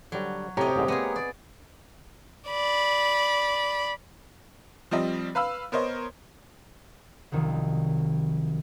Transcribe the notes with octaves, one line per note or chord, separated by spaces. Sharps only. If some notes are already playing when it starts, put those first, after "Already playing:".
D3 F#3 G3
A2 C3 G4 C#5 D#5 A#5
A1 G#2
G#3 A#3 B3 G#4
D5
D5 B5
F3 G3 C4 D#5
B4 F5 B5 E6
B3 A#4 C5 C#5 D#5
C2 D#3 F3 F#3